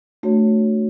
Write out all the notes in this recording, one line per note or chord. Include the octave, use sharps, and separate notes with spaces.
A3 D4 F#4 C#5